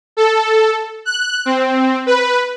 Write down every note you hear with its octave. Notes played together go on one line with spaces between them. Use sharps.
A4
F#6
C4
B4